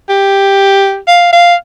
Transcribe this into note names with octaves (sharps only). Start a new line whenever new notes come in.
G4
F5
F5